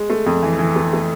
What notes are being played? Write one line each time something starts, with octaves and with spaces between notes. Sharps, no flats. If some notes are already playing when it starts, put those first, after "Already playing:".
Already playing: G#3
A3
F2
E3
E3
A3
A3